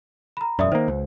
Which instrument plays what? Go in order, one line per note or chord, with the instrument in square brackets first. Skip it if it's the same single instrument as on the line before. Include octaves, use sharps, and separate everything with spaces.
[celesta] A#5 B5
[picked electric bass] E1 F#2 [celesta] D5 E5 D#6
[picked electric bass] D#3 A#3 [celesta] C5
[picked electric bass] C#2